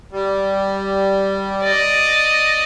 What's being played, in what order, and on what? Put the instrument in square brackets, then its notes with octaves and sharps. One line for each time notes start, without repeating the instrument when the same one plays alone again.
[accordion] G3
[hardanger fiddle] D5 D#5